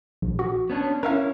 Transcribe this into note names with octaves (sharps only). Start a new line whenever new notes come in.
A#1
F#4
B3 C#4 D4
C#4 E4 A#4 E5 F5